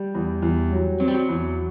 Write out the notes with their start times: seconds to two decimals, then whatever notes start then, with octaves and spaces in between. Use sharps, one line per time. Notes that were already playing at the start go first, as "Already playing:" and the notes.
Already playing: G3
0.15 E2
0.42 E2
0.72 F#3
1.00 F#3 C4
1.08 G3
1.14 F#3
1.29 E2